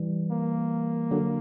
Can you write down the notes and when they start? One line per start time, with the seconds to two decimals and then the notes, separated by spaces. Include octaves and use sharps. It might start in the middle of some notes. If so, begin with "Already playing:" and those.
Already playing: E3 G3
0.31 A#3
1.11 D3 F#3